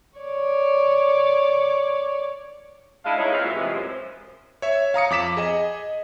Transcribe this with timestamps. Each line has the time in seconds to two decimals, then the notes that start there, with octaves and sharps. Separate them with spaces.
0.18 C#5 D5
3.05 G#3 D4 E4 D#5 F5
3.18 G#3 C#4 D#4 E4 G#4 C#5
3.32 C4 F4 B4
3.44 A#2 F#3 G#3 E5
3.56 C3 E3 F3 G#3
3.74 F#2 C5
4.62 C#5 E5
4.94 F5 A#5 D#6 C#7
5.10 F2 D6 B6 E7
5.37 G#4 D#5